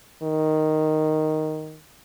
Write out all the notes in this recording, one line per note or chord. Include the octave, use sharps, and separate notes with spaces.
D#3